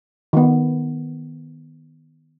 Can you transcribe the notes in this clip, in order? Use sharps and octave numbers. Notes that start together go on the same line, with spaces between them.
D#3 B3